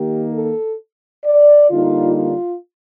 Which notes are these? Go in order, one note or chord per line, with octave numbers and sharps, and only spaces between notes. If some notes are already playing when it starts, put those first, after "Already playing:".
Already playing: D#3 A#3 D#4 G4
A4
D5
D3 G3 A#3 D#4 F4
F4